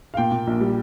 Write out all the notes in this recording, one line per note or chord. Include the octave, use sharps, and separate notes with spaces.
F5
A#2 G5
A#2
A#1
G3